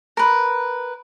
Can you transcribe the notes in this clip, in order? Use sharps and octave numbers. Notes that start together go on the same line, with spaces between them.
A#4 B4